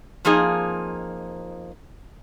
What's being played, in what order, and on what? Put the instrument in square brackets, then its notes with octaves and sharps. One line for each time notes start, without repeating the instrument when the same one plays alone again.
[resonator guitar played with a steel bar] F2 F3 A#3 D#4 G#4